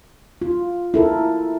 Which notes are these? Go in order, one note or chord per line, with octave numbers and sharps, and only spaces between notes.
F4
E4 A4 A#4